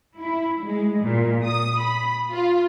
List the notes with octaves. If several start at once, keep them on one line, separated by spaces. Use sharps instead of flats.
E4
G#3
A#2
D#6
B5
F4